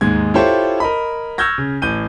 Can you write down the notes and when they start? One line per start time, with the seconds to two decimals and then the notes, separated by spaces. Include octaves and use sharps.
0.01 D#2 G#2 G#3 D#4 G#6
0.34 E4 F4 G4 A4 C5 C#5
0.80 A#4 D#5 B5
1.38 C#6 E6 F6 G6 G#6 A#6
1.58 C#3
1.82 A1 G6 D#7